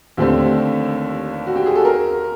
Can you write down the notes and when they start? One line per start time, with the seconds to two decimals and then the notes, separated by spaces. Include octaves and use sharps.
0.17 D#2 D3 F3 A3 C4 G4
1.47 F#4
1.56 G4
1.66 G#4
1.75 A4
1.85 A#4